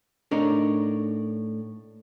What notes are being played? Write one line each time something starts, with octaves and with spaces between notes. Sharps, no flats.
A2 D4 D#4 A#4 C#5